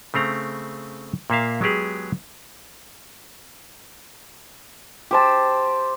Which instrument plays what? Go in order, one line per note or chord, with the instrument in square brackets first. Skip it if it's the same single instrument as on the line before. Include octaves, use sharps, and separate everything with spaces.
[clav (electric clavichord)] C#3 A3 C4 A#5
A#2 A#3 E5 F5
F#3 G#3 B3 G4 G#4
[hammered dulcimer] G4 C5 A5